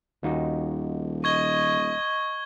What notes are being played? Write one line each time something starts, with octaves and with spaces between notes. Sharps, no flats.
D#1 D#2 D#4 F#4
D#5 C#6 G#6 G7